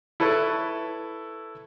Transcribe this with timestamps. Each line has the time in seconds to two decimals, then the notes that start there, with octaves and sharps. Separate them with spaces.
0.20 E4 A4 B4 C#5